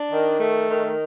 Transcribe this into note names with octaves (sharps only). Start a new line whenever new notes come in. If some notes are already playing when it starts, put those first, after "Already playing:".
Already playing: D4
D#3
A3
D#3